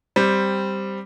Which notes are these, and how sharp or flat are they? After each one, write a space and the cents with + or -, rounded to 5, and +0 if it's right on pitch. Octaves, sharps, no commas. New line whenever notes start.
G3 +0 C4 +0